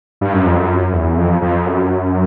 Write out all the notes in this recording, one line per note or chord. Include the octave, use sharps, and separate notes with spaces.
G2
F#2
F2
F#2
E2
F2
F2
F#2